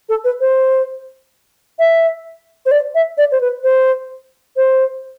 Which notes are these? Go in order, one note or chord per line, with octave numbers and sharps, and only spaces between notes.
A4
B4
C5
E5
C5
D5
E5
D5
C5
B4
C5
C5